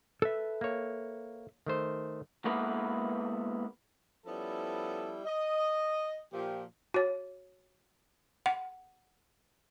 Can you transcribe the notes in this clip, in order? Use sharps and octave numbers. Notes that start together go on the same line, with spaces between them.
A4 B4 E5
A#3 C#5
D#3 A3 C5
G#3 A#3 B3 E4 A#4 B4
F3 G3 B3 C#4 E4 A4
D#5
A#2 F3 G4
F#4 C#5
F#5